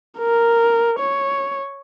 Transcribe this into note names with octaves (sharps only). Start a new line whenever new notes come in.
A#4
C#5